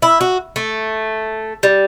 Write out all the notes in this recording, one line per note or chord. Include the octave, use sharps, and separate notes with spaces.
E4
F#4
A3
G3